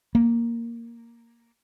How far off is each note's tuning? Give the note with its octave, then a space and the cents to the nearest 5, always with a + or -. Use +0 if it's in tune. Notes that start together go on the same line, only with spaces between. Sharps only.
A#3 +0